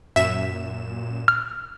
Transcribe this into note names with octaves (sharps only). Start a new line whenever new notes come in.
F#2 A#2 E5 E7
F6